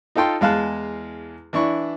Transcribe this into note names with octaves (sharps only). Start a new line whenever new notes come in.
D#4 F4 A4 G5 C6
E2 G#3 F5 A5 F#6
E3 D4 E4 C#6